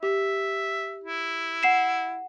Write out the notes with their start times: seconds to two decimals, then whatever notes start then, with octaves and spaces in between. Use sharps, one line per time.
0.03 G4 E5
1.04 E4
1.63 F#5 C7 E7